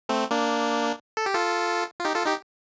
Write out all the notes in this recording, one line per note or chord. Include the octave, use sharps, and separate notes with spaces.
A3 C4
A#3 D4
A4
G4
F4 A4
F4
D#4 G4
F4 A4
D#4 G4